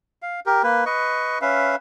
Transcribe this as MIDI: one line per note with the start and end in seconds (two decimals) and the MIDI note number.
0.22 0.40 77
0.46 0.62 67
0.46 0.62 70
0.63 0.84 58
0.63 0.84 71
0.86 1.38 71
0.86 1.38 75
0.86 1.38 85
1.42 1.76 61
1.42 1.76 71
1.42 1.76 76
1.42 1.76 77